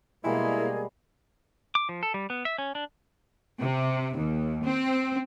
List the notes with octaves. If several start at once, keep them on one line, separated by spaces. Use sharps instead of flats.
B2 G3 G#3 A#3 E4 G#4
D6
F3
A4
G3
B3
E5
C#4
D4
C3
D#2
C4